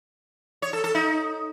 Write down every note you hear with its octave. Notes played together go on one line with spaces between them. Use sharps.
C#5
A4
A4
D#4